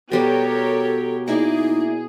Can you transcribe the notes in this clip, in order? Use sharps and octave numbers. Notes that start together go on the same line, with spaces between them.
B2 G3 G4 A4 A#4 C#5 G5
A#3 D#4 E4 G#4 D5